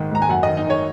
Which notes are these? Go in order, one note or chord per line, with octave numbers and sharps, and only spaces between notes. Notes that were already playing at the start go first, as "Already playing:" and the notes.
Already playing: G#2 D#3
G#2 A#5
G#5
F#2 F#5
D#5
D#3
D#4
D#3 C#5